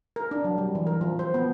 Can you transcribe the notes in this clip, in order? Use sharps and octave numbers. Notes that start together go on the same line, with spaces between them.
A#4
D4
F#3
G3
E3
A#4
F3
C5
B3